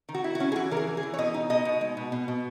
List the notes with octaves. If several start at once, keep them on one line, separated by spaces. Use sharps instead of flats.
D#3
F#4
E4
F#4
C#4
G#4
E3 F#4
E3 A#4
G#4
E3
G#4
E3
C#5
B2 D#5
D#4
B2 D#5
B2
G#3
B2
B2
B2